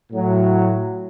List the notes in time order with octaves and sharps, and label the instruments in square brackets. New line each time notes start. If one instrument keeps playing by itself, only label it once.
[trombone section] A2 F#3